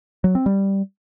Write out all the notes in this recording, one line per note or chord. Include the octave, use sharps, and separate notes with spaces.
F#3
C4
G3